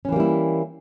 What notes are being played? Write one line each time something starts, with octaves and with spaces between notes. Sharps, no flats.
E3 G3 A#3 C#4 E4